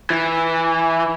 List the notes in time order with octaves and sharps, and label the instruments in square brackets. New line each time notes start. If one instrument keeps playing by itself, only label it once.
[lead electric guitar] E3